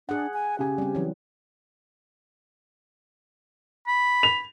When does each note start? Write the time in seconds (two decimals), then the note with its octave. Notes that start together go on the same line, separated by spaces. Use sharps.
0.09 D4 G#4 F#5
0.34 G#5
0.59 C#3 G4 G#5
0.78 G3 C4
0.95 E3 F#3
3.87 B5
4.23 F7